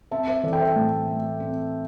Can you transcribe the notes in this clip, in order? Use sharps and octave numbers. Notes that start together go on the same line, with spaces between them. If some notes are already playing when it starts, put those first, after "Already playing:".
C4 E5 A5
C5 E5
E3 A4 D5
G5
C5 E5
A2
A3
C4